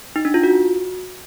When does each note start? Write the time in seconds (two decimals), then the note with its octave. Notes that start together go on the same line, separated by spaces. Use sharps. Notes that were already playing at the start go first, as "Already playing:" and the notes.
0.16 D#4
0.25 D4
0.34 F4
0.43 F#4